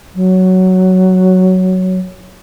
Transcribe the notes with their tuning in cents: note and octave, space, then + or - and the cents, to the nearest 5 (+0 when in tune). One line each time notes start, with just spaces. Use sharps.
F#3 +5